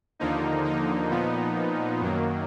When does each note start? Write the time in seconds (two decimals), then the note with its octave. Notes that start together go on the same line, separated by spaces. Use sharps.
0.20 D#2 D3 F3 A#3 D#4
0.64 D#4
1.10 A#2 F3 B3
2.01 F#2 D#3 F#3 A#3